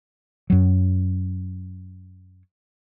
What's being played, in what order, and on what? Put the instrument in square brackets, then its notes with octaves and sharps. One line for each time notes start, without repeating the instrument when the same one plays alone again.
[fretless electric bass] F#2 F#3